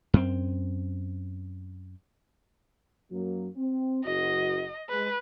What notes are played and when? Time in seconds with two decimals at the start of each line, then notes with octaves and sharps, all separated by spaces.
0.14 F#2 C4
3.11 F#2 F#3 A#3
3.57 C4
4.05 F#1 F#4 D#5
4.89 G#3 B4